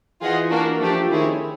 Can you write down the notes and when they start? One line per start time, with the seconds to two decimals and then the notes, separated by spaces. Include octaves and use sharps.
0.21 E3 F4 G#4 C5 D#5 F#5
0.51 A#3 D4 F#4 A#4
0.80 F3 A3 D4 G4
1.10 D#3 C4 E4 G#4 C#5